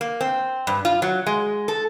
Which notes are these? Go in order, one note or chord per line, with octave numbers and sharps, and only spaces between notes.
A#3
C4
G2
F4
F#3
G#3
A4